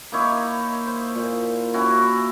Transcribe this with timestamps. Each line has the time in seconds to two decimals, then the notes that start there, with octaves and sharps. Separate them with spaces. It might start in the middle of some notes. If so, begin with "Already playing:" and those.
0.12 A#3 D#4 E4 C#5
0.87 C5
1.15 A#2
1.74 C#4 E4 F#4